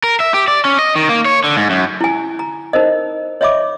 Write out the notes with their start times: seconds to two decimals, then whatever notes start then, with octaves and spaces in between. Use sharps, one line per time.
0.04 A#4
0.20 E5
0.34 G4
0.48 D5
0.65 C#4
0.79 D#5
0.96 D#3
1.09 A#3
1.25 C#5
1.44 D3
1.57 G#2
1.70 F#2
2.01 E4 G#5
2.39 A#5
2.73 D#4 A#4 C5 D#5
3.41 C#5 D#5 E5 B5 D6